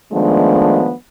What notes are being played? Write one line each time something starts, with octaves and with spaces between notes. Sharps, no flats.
D#3 F3 G#3 A3 B3 D4